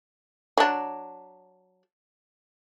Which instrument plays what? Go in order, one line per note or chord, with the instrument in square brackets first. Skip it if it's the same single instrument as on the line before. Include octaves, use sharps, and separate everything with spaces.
[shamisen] F#3 D4